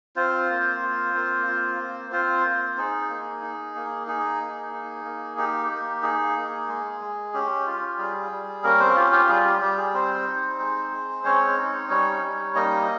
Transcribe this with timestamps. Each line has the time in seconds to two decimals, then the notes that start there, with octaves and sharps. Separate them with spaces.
0.16 C4 F4 C5
0.50 A#3
0.82 F4
1.15 A#3
1.47 F4
1.80 A#3
2.11 C4 F4 C5
2.45 A#3
2.77 D#4 G#4
3.09 A#3
3.42 D#4
3.75 A#3
4.07 D#4 G#4
4.41 A#3
4.73 D#4
5.05 A#3
5.37 D#4 G4
5.71 A#3
6.03 D#4 G#4
6.36 A#3
6.68 G#3
7.01 G#3
7.34 C#4 G4
7.67 F4
7.98 G3 G#4
8.32 G3
8.63 A#3 C#4 A#4
8.79 C4 C5
8.96 F4 G4
9.12 G4
9.29 G3 G#4
9.45 G4
9.61 G3 G4
9.78 G#4
9.94 C4 C5
10.27 D#4
10.59 G#3
10.92 G#3
11.24 C4 C#4 C#5
11.57 D#4
11.90 G3 C#4 C#5
12.22 G3
12.55 A#3 D#4 D#5